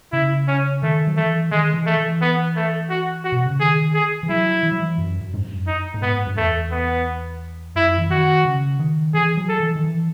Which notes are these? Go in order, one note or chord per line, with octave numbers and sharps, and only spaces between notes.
C#3 E4
C#4
D#3 A3
F#3
E3 A3
D#3 G#3
E3
A3
E3
B3
A3
F#4
F#4
B2
C#3
D#3 G#4
G#4
E3
F#3 E4
E3
F#3
E3
F#2
F#2
G#2
F#2
D#4
A2
G#2 B3
F#2
E2 A3
B3
F#2 E4
E3
D#3 F#4
C#3
D#3
E3 G#4
F#3
A4
E3
D#3
E3